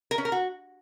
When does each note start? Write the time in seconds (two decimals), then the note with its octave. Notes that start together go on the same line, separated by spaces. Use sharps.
0.11 A#4
0.18 C#4
0.25 A#4
0.32 F#4